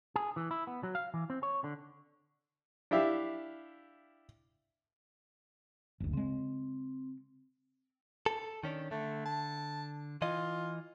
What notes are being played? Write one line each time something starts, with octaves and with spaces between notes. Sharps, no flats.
G#4
E3
E4
B3
F#3
F5
E3
C4
C#5
D3
D4 E4 G4 E5 F5
F#1 D2
C#3 G#3 C4
A4
D#3 C#4 D4
D3 A3
A5
E3 F4 D#5